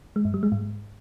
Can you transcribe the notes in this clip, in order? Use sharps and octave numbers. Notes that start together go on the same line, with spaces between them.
G#3
G2
G3
G#3
G#2